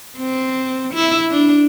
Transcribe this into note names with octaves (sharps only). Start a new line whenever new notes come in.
C4
E4
D4